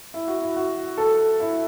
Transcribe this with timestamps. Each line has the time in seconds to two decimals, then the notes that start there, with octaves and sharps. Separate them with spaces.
0.14 E4
0.28 F#4
0.42 E4
0.56 F#4
0.97 A4
1.40 E4